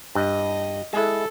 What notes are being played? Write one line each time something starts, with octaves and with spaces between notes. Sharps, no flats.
G2 D#5
G#3 E4 A4